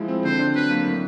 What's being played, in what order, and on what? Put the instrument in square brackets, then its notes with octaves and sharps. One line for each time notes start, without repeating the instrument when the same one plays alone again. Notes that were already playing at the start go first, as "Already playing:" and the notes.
Already playing: [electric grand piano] F3 G#3 E4
C4
[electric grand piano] D3 [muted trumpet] C5
[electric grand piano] D4
[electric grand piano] F#3 [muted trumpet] B4
[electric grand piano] A#3
A2